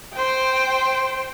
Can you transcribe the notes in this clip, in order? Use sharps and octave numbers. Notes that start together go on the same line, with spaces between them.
C5 G5